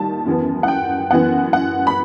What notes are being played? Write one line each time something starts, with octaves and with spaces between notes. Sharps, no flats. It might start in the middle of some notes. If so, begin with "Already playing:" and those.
Already playing: D#2 D#3 G3 A5
F#2 E3 B3
F#5
G5
F#2 E3 B3 F#5
F#5
B5